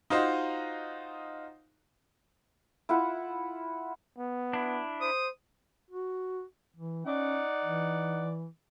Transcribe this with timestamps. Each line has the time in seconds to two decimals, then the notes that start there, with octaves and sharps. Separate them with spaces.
0.10 D#4 F4 F#4 C5 D#5
2.89 E4 F4 E5 F#5
4.18 B3
4.53 D4 E4
5.01 C5 D#6
5.91 F#4
6.76 E3
7.06 C#4 D#4 D5 F#5
7.65 E3